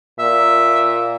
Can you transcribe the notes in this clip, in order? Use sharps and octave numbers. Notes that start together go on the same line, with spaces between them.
A#2 E5